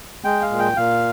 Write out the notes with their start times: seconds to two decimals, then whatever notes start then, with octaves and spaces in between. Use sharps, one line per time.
0.24 G#3 G5
0.42 F5
0.51 A#2
0.59 G5
0.77 A#2 F5